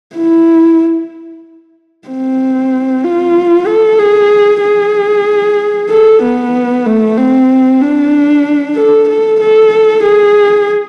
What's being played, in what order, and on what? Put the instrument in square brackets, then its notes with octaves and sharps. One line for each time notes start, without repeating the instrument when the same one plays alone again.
[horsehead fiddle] E4
C4
F4
A4
G#4
G#4
A4
B3
A3
C4
D4
A4
A4
A4
G#4